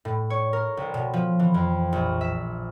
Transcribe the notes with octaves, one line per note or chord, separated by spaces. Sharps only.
A2
C#5
A#4
C2
B2
F3
E3
F2
A#1
E5